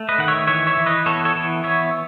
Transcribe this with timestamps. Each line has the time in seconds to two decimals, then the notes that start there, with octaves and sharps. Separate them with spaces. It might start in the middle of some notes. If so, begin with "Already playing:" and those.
Already playing: A3
0.09 B4 D#5
0.18 D#3 F#5
0.28 C#5 E5
0.47 E3 C#5 E5
0.67 C#5 E5
0.77 E3
0.86 B4 D#5
1.06 B3 A4 C#5
1.25 A4 C#5
1.35 E3
1.64 B3 C#5 E5